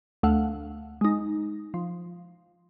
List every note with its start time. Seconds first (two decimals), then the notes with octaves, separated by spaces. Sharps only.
0.23 D2 A3 F5 F#5
1.01 G#3 D#4
1.74 F3